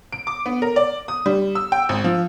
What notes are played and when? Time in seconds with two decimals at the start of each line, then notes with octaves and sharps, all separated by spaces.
0.13 D7
0.27 D6
0.46 B3
0.62 A#4
0.76 D5
1.08 D#6
1.26 G3
1.55 E6
1.72 G5
1.89 G#1
2.04 F3